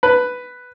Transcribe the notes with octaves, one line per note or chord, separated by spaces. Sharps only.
B4